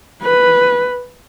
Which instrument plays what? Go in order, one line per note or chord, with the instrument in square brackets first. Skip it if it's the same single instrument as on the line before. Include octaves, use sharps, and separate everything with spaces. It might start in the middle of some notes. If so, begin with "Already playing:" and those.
[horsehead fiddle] B4